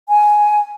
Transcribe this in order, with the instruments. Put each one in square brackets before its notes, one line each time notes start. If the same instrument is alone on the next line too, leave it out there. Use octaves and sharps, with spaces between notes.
[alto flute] G#5